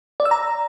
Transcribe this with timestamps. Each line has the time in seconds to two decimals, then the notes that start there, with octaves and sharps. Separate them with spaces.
0.20 D5
0.25 E6
0.31 A#5